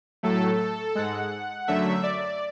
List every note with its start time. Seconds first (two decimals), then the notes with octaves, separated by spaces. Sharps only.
0.23 A2 F#3 A3 A4
0.95 G#2 G#3 F#5
1.68 F#2 D3 F#3 A3 E5
2.03 D5